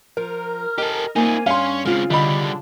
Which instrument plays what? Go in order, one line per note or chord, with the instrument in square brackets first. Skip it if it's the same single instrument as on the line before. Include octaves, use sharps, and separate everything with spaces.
[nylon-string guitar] F3 [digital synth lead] A#4
[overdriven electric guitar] G4 A4 [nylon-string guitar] D#5
[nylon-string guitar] A#3 C4 [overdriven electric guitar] D#4 F4 [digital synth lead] G#5
[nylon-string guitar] G2 [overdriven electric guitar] C#4 [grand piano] F5 C6
[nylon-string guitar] C#3 F4 [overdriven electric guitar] G#3 C4 [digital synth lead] F6
[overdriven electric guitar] C2 G3 [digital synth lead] D3 [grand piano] D#5 B5